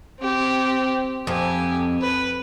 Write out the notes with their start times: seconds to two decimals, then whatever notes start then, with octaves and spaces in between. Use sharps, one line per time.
0.20 C4 G4
1.27 F2 G4 G#5
2.01 B4